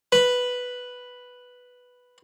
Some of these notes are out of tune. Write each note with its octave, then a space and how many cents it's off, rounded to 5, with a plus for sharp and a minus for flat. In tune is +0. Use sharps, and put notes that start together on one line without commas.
B4 +0